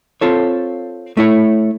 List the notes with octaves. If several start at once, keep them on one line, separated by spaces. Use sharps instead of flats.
C4 F4 A4 C#5
A3 E4 C#5